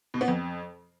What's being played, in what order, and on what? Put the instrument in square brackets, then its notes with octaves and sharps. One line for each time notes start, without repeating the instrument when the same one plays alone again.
[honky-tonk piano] B2
B3
F2